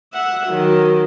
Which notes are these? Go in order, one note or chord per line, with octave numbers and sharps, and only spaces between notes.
E5 F#5
D#3 F#3